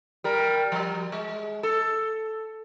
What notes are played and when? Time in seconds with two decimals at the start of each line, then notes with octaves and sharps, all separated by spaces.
0.24 G3 A#4
0.72 F3 G3
1.12 G#3
1.63 A4